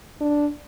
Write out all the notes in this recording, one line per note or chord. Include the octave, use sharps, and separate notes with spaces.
D4